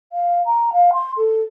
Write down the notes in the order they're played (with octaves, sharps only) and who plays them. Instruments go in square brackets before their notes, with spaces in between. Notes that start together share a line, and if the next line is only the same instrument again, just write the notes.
[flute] F5
A#5
F5
C6
A4